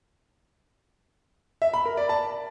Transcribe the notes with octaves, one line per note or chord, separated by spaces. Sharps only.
E5
B5
A#4
D5
A5